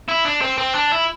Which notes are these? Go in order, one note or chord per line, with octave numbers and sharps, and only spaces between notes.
E4
D4
C4
C4
D4
E4